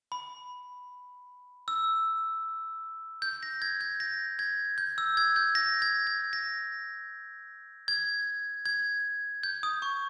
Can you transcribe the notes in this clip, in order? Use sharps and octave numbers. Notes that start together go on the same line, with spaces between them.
B5
E6
G6
A#6
G#6
G6
A#6
G#6
G6
E6
G#6
G6
A#6
G#6
G#6
A#6
G#6
G#6
G6
D#6
C#6